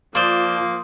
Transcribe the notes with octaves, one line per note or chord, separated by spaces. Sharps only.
F3 A#3 C5 D5 C6 D#6 G6